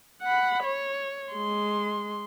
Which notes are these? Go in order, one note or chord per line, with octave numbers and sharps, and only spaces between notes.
F#5 B5
C#5
G#3 C6